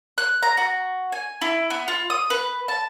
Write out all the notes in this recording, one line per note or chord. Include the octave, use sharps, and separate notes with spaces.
F#6
A#5
F#4
G#5
E4
B3
F4
D#6
B4
A5